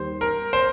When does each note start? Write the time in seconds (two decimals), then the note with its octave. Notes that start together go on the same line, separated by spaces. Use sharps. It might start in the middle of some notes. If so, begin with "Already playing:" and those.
Already playing: D#2 D#3 G3 C5
0.21 A#4
0.53 C5